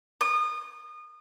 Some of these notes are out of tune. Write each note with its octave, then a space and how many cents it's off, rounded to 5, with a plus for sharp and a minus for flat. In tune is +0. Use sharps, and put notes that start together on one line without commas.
D#6 -30